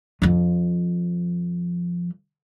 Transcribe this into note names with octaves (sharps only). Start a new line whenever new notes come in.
F2 F3